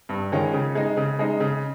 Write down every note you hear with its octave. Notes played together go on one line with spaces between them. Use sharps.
G2
D#3 G#3 C#4 F4
C#3
G#3 D#4
C#3
G#3 D#4
C#3